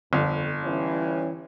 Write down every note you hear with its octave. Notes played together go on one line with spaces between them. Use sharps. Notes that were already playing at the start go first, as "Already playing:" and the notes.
G1 F2
E3 G3 C#4